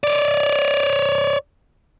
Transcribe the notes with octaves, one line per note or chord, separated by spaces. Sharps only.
C#5 D5